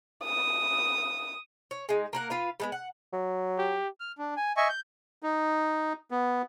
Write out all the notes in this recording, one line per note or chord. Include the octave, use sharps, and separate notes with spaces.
D#6
C#5
G#3 D#4
A#3 A#4 F#5
F4 B4 F5
G3 G#3 B3
F#5
F#3
G4
F6
D4
G#5
D#5 E5 G#5 C#6
G6
D#4
B3